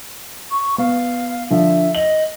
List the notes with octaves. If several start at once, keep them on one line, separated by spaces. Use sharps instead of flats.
C#6
B3 F5
D3 F3 E5
D#5 F#7